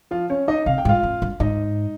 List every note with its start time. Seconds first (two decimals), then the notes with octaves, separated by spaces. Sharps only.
0.11 F3 F4
0.30 C#4 C#5
0.48 D#4 D#5
0.66 C3 F5
0.78 G5
0.85 G#2
0.89 F4 F5
1.03 F2
1.22 G2
1.40 G#2 D#4 D#5